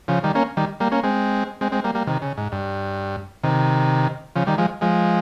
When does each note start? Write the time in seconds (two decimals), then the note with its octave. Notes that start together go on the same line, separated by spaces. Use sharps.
0.08 C#3 F3
0.23 D#3 G3
0.35 A#3 C#4
0.57 D#3 G3
0.80 G3 A#3
0.92 A#3 C#4
1.03 G#3 C4
1.61 G#3 C4
1.72 G#3 C4
1.84 G3 A#3
1.95 G3 A#3
2.07 C3 D#3
2.22 C#3
2.37 G#2
2.52 G2
3.43 C3 D#3
4.36 C#3 F3
4.47 D#3 G3
4.58 F3 G#3
4.81 F3 G#3